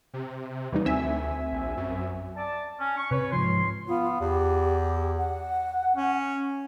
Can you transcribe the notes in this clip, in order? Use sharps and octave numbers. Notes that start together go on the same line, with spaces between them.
C3
D#2 E3 G3 D#4
D2 C4 E5 G#5
A#1
F#2
D5 A5
C#4
C#6
C3 B4 C#5
G#2 F3 C6
B3 F4
E2 G4
F#5
C#4